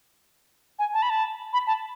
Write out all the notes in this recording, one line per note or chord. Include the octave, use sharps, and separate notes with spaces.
G#5
A5
B5
A5
B5
A5